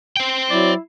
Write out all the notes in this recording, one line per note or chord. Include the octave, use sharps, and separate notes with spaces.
C5 G5
F#3 E4 D5